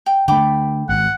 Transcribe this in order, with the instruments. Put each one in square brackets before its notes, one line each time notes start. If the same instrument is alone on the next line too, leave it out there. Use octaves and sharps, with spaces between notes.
[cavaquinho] G5
[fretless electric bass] D3 A3 [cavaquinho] G5 B5 D6
[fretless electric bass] G#1 [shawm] F#5